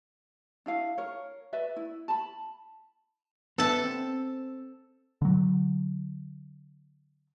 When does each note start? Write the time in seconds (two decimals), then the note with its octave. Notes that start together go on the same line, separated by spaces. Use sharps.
0.66 D4 E4 F5
0.98 A#4 C#5
1.53 B4 D5 E5
1.76 E4
2.08 A5 B5
3.58 B3 D4 A4 E5 A5
3.84 C4
5.22 D3 F#3